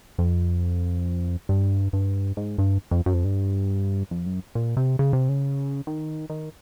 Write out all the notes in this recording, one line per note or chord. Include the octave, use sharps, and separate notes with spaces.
F2
G2
G2
G#2
G2
F2
F#2
F2
G2
F2
F#2
A#2
C3
C#3
C3
C#3
D#3
D#3